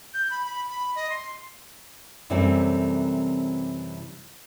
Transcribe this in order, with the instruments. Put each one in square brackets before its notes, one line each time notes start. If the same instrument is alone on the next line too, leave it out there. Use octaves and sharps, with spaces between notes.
[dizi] G6
B5
B5
B5
D#5
C6
[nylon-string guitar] F#2 C3 E3 G3 A3 C4